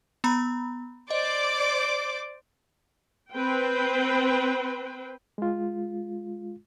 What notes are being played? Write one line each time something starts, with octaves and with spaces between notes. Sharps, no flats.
B3 A#5 B5
C5 D5 D#5 D6
C4 B4 C5 G5
G#3 F4